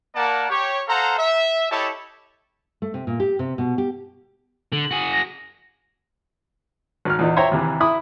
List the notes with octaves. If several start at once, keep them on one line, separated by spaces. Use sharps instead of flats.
A#3 A#4 D5 F#5 A5
G4 C#5
A4 C5 F5 F#5 A#5
E5
E4 G4 A4 C#5 D#5 A5
A3
C3
A#2
G4
C3
B2
G4
D3 F#7
F#4 G#4
A#6
G#1 F6
E2 A#2 D#4
C5 C#5 E5 G5 A#5 C6
D#2 C3 E3
E4 B5 D#6